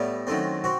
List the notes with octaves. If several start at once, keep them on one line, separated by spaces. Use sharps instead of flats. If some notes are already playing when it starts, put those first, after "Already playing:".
Already playing: A2 G3 B3 E4
F#2 D#3 A3 C4
C4 F#4